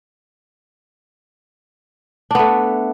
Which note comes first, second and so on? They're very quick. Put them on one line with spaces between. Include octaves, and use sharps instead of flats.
D4 B3 A3